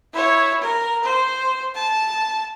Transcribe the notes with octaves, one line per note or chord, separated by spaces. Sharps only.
E4 C#5
A#4
C5
A5